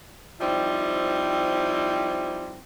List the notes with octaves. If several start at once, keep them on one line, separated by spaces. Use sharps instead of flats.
F3 G3 C4 D#4 E4